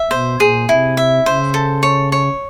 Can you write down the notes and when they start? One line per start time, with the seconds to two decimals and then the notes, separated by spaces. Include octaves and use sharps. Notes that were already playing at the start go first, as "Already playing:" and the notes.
Already playing: E5
0.11 B2 C5
0.40 A#2 G#4
0.68 C3 E4
0.97 E5
1.25 C#3 C5
1.54 A4
1.83 C#5
2.12 C#5